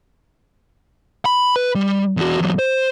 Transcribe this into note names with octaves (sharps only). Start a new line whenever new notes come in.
B5
B4
G3
E2 F#4
E2 F#3
C5